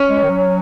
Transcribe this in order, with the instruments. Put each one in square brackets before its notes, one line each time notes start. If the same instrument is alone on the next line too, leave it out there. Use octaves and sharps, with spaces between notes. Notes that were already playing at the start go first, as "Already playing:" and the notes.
Already playing: [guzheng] C#4
[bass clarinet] G#3
D#3
F#3